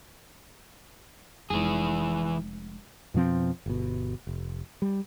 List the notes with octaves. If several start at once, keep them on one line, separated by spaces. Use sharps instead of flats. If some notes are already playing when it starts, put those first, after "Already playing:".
F1 E3 G#3 G#4
F2 B2 F3 C4
G1 B2
F1
G3